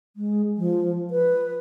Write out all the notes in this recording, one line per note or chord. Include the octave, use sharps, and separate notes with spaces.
G#3
F3
B4